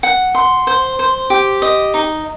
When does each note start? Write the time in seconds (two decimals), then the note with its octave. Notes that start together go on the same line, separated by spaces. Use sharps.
0.03 F#5
0.35 C6
0.67 C5
0.99 C5
1.30 G4
1.62 D#5
1.94 D#4